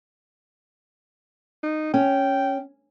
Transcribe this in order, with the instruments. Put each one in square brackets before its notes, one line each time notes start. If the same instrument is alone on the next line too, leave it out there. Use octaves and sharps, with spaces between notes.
[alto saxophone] D#4
[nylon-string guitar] C#4 [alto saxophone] G5